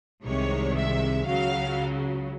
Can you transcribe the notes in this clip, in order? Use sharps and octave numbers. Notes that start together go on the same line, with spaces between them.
C2 C3 D#3 G#3 C#5
E5
C#2 C#3 F#3 F5